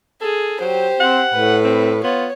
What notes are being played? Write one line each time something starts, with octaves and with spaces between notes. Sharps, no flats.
G#4 A4
F#3 G4 C5
C4 F#5
A2 B4
C4
B3 F4 C#5